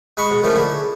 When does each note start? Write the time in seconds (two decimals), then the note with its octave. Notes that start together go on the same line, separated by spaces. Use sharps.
0.17 G#3 B5 C#6
0.30 B2 G#4
0.44 F3 A3 C#4 A#4
0.55 D3 E4
0.71 G#4